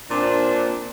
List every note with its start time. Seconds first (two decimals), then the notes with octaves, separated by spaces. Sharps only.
0.10 A#2 C4 D4